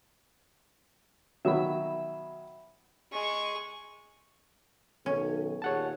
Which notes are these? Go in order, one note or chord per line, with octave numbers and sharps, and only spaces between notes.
B2 D#3 F#3 E5 B5
G#3 C#6
B1 F#2 D#3 C#4 A4
D#2 A#2 G#4 C#5 F#5 A5